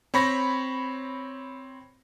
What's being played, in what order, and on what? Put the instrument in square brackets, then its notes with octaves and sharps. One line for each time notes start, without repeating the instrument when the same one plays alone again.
[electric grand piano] C4 C#5 B5 C#6 A#6